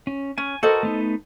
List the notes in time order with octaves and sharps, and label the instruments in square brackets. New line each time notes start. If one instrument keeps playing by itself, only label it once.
[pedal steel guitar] C#4
[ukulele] C#4 [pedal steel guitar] G#5
[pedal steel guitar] F#4 A#4 [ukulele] A4 C5 D#5
[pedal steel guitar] A3 B3 D#4